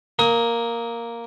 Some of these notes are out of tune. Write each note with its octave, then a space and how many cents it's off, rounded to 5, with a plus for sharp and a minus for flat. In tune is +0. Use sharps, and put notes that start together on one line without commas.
A#3 +0 D#6 +30